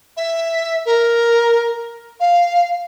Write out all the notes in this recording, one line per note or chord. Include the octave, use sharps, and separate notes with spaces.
E5
A#4
F5